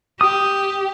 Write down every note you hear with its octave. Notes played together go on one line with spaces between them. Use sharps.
G4 D#6